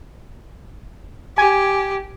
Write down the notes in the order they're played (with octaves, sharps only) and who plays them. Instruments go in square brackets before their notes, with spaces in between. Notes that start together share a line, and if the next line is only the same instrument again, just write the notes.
[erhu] G4 [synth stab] G#5